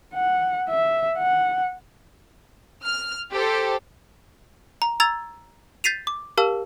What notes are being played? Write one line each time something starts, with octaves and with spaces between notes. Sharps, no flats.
F#5
E5
F#5
F6
G4 A4 C5
A#5
A#5 E6 G#6 A6 F7
G6 A6 B6 C7 D#7 F7
D6
G4 A#4 F5 A5 E6